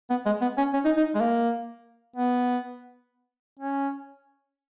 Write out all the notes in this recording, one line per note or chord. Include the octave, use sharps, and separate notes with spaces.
B3
G#3
B3
C#4
C#4
D#4
D#4
G#3
A#3
B3
C#4